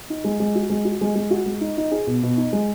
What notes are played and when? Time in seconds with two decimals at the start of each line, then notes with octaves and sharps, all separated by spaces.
0.10 D#4
0.24 G#3
0.40 G#3
0.55 F#4
0.70 G#3
0.85 F#4
1.01 G#3
1.15 G#3
1.30 F#4
1.46 G#3
1.61 D#4
1.77 D#4
1.92 G#4
2.07 B2
2.23 B2
2.37 D#4
2.53 G#3